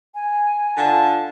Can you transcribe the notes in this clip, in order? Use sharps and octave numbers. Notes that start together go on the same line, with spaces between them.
G#5
D3 F4 A5